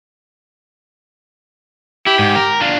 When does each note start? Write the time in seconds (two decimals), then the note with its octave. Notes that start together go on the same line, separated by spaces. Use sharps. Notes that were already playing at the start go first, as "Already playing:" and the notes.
2.07 E4 G4
2.19 G#2
2.36 A#4
2.61 D4 F4